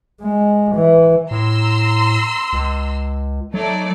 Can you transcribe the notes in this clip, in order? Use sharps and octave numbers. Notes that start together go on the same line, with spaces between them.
G#3
E3
A2 A#5 C6 E6
C#2
F#3 A3 D#4 D5